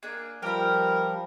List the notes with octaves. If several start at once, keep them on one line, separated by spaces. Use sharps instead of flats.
A#3 D4 G#4
F3 G3 A#4 G5 B5